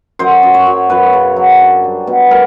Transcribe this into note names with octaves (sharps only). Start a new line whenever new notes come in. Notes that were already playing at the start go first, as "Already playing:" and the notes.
F#2 C5
F#2
C#5
F#2
F#2 B4
C#3
F#3
D4
G3
B2
G3 A#4